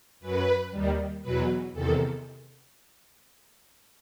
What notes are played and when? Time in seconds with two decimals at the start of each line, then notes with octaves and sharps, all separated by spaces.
0.20 F#2 F#3 B4
0.70 D#2 D#3 G3
1.22 E2 B2 F#3 B4
1.72 E2 C3 D#3 A4